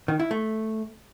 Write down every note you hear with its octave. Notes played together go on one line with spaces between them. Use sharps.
D#3
E4
A3